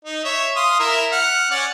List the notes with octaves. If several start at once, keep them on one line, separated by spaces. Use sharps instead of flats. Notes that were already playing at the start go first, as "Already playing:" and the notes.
D#4
C#5 E5
F5 C6 D#6
E4 A#4 E5
F#5 F6
C#4 D5 F#5